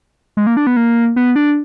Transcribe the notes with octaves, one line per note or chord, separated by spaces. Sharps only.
G#3
A#3
D4
B3
A#3
B3
D4